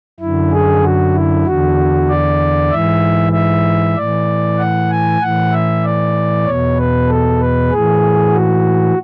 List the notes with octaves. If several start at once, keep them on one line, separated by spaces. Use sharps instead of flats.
F#2 D3 E4
G#4
F#4
E4
E2 D3 F#4
D5
G#2 E3 E5
E5
A2 E3 D5
F#5
G#5
A2 E3 F#5
E5
D5
E2 B2 C#5
B4
A4
B4
A2 E3 G#4
F#4